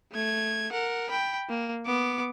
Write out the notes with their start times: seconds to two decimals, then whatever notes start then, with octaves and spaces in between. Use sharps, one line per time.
0.12 A3 G#6
0.72 A#4 F#5
1.10 G5 B5
1.49 A#3
1.86 B3 D6